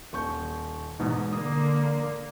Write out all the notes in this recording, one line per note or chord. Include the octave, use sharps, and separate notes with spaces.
D#1 C#6 G6
E2 G#2 B2
D3 A#3 D#6